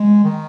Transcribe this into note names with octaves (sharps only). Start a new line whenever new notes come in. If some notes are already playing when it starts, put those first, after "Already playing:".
Already playing: G#3
D#3